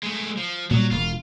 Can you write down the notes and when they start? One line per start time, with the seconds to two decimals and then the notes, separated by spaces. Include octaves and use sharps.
0.03 G#3 A3
0.37 F3
0.71 A#2 F#3 G3
0.91 E1 F4